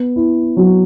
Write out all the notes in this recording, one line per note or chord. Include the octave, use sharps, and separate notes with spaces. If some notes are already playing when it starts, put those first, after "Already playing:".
Already playing: B3
E4
F#3